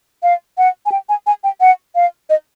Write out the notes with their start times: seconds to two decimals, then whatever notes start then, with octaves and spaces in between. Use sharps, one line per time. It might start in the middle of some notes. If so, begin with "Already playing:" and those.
0.23 F5
0.58 F#5
0.86 G#5
0.92 G5
1.09 G#5
1.27 G#5
1.44 G5
1.61 F#5
1.95 F5
2.30 D#5